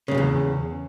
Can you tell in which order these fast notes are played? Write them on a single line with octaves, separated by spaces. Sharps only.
C#3 G2 A#2 E2